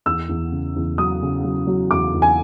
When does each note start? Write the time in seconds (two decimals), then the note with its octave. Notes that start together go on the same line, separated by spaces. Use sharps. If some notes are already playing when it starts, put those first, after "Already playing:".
0.06 E2 E6
0.29 E2
0.52 C#3
0.76 E2
0.98 F#3 D#6
1.22 C#3
1.44 F#3
1.67 F#3
1.91 E2 D6
2.14 E2
2.22 G#5